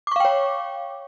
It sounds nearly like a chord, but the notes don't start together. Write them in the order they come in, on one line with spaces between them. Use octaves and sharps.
D6 C#6 F5 G5 C#5